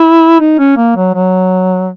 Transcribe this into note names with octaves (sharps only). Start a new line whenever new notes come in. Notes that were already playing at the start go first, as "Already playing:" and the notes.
Already playing: E4
D#4
C#4
A#3
F#3
F#3